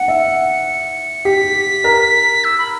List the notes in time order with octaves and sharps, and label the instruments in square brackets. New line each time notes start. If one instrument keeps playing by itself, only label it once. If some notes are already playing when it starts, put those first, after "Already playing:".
Already playing: [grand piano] F#5 [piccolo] C#7
[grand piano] E5
[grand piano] G4 [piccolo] B6
[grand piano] A#4
[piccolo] E6
B5